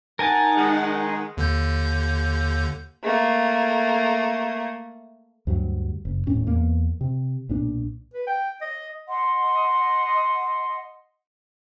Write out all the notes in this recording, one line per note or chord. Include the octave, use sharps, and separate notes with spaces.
D#4 A#4 F#5 G#5 A5
D#3 G#3
D#2 D3 G6
A3 A#3
D2 G2 F#3
F#1
D#1 A2 C#4
E2 A#3
C3
B1 A#2 D4
B4
G5
D#5
D#5 F#5 C6